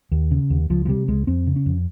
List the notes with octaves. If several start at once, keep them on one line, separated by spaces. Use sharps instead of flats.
D#2
C#3
D#2
C#2 F3
F3
C3 G3
C#2 G#3
F2 C4
C#3
C#4
F2